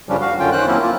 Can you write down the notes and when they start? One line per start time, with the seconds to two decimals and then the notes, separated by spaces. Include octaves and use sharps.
0.09 F#2 C#3 F3 G3 C#4 D4
0.21 F#4 F5
0.39 F#2 D3 C#4 F4 G5
0.52 D#3 C#4 C5 F#6
0.67 F#3 A#3 C4 C#4 E4
0.81 F4